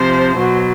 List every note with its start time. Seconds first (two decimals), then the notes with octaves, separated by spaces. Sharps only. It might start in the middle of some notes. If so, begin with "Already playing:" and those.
Already playing: C3 F3 C5
0.37 B2 F#3